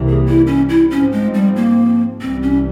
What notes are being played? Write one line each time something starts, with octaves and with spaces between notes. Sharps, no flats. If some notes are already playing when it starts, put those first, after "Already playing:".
Already playing: C2 C3 E3 G3 A#3
G#4
E4
C#4
E4
G#2 F3 C4 C#4
G#3
G3
A#3
C2 C3 E3 G3 C4
C#4